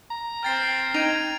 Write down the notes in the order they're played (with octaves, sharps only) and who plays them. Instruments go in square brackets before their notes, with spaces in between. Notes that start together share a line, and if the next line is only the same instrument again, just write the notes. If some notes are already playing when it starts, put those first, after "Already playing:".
[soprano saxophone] A#5
[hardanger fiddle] C4 G5 [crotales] F6 A6 C7
[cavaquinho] D#4 [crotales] G#6 D7 F7